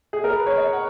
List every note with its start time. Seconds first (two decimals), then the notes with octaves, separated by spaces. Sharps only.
0.13 G#4
0.24 A#4
0.36 B4
0.46 C#5
0.57 D#5
0.73 F#5